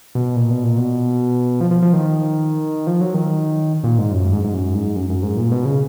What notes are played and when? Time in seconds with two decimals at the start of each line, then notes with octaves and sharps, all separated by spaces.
0.15 B2
0.36 A#2
0.50 B2
0.63 A#2
0.78 B2
1.61 F3
1.71 F3
1.82 F3
1.93 D#3
2.87 F3
3.01 F#3
3.14 D#3
3.84 A#2
3.98 G#2
4.12 F#2
4.33 G#2
4.44 G#2
4.54 F#2
4.75 G#2
4.96 F#2
5.10 F#2
5.23 G#2
5.37 A#2
5.51 B2
5.65 C#3